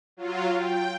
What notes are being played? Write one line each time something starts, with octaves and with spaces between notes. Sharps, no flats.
F#3 F4
G5